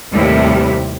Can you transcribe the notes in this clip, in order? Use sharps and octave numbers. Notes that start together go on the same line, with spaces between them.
D#2 A2 C3 G3 E4